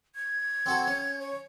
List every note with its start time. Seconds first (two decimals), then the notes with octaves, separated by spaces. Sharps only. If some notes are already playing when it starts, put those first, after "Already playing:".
0.15 G#6
0.66 C4 F#4 A4
0.87 C#4
1.20 C#5